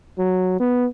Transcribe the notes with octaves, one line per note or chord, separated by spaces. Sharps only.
F#3
B3